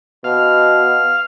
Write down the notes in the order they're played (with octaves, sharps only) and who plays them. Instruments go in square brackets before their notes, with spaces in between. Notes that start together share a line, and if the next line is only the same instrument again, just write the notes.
[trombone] B2 [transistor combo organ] F5